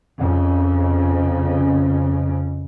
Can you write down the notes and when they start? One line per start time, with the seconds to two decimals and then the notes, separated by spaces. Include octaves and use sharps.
0.17 F2 C#3